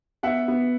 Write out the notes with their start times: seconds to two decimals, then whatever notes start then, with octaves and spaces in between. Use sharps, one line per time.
0.23 B3 E5 F#5
0.48 B3